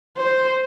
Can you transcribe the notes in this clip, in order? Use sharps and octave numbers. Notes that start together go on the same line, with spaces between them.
C5